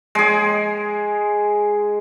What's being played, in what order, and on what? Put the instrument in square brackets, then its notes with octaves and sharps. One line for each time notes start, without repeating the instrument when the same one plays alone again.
[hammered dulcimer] G#3 G#4